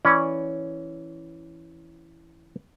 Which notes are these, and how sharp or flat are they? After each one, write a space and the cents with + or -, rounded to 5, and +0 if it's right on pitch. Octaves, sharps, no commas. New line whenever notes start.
E3 +0 C#4 +0 D5 +0